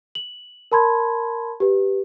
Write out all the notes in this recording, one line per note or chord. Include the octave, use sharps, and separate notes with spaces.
F#7
A#4 A5 B5 C6 G#6
G4 B4